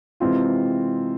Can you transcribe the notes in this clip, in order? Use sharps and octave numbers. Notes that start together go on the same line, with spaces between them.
C3 E3 G#3 C4 F4